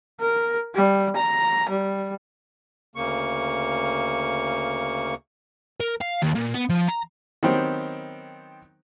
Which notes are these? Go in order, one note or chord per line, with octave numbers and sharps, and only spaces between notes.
A#4
G3
A#5
G3
D2 C#3 A#3 C#6
A#4
F5
D#2
A#2
B3
F3
A#5
D#3 F#3 B3 C4 G4 C5